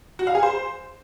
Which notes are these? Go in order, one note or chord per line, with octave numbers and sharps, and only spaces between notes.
F#4
F5
G#4
C5